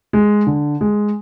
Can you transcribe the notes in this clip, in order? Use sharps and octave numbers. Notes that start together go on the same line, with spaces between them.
G#3
D3
G#3